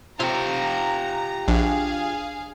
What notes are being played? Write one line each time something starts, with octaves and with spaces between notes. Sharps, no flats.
C3 F4 G4 E5 A#5
A#1 D4 G#4 F5